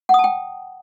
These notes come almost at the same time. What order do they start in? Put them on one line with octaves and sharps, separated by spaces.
F#5 D#6 A5 G5